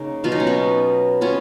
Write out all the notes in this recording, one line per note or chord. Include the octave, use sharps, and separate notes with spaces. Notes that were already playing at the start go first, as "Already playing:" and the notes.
Already playing: C#3 A#3 C#4 D#4
B2 F#3 B3 F4
D#4
C#4
B3 D#4
B3 C#4 F4